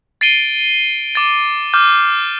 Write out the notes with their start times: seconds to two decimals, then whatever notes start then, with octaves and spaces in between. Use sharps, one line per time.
0.21 A6 C7 D7 D#7 G7
1.15 D6 A6
1.74 D6 F6 G6